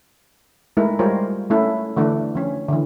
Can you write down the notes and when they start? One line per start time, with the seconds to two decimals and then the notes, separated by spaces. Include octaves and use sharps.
0.77 G#3 A3 D#4 E4 A#4
0.99 G3 G#3 F4 A#4 C5 C#5
1.50 A3 C#4 E4 A4
1.96 D3 E3 A3 D4
2.35 F3 C#4
2.68 D3 E3